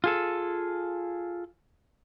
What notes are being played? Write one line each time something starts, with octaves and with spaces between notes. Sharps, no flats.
F4 G#4 A4